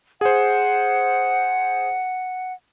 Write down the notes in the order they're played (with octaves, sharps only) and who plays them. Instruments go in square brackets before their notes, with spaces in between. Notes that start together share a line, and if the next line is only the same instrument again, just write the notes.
[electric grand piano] G#4 C5 [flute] F#5